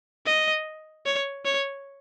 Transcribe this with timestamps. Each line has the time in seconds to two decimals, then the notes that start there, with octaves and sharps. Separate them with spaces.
0.26 D#5
1.06 C#5
1.45 C#5